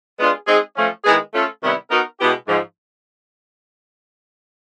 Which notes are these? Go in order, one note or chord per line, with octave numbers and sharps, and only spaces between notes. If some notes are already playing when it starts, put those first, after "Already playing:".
G#3 B3 D4 F4 G#4
G#3 C4 D#4 G#4
F3 A3 C#4
D#3 G#3 B3 E4 G#4
A3 C#4 F4 A4
C3 D#3 G3 B3 E4
B3 D#4 F#4 A#4
B2 G#3 B3 E4 G4
G#2 F3 G#3